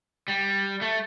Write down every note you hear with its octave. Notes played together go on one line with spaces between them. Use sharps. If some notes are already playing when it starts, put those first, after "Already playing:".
G3
A3